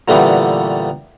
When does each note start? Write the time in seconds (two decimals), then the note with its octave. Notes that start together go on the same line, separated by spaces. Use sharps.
0.08 A#2 D3 E3 G3 A3 B3